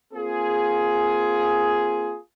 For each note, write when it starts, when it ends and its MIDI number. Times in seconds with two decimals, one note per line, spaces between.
0.13 2.17 58
0.13 2.17 60
0.13 2.17 65
0.13 2.17 68